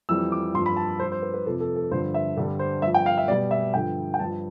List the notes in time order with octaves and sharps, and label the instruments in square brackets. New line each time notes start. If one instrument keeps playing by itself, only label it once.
[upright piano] F2 E3 G3 E6
D6
G2 C6
F3
B5
A5
G2 F3 C5
C5
B4
B4
F2 C3 F3 A4
A4
A4
G2 D3 F3 C5
E5
G2 D3 G3 A4
C5
G2 F3 E5
G5
F5
E5
B2 G3 D5
E5
G2 D3 F3 G5
G5
G2 F3 A5